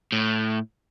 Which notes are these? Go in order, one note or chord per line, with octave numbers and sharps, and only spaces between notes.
A2